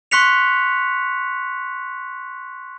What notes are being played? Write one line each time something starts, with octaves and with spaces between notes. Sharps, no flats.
C6 C#6 F#6 B6 C#7 F7